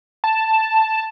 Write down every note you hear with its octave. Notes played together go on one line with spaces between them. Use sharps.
A5